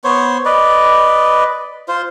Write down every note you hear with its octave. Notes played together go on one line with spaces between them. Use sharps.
B3 C5 C#5
B4 D5 D#5
F4 C5